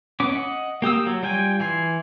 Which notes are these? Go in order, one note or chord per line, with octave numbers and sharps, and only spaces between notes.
B3 C#4 D6
D#5 F#5
A#3 G4 D#6 E6
F#3
G3 F4 G5 G#5
E3 G#5 C6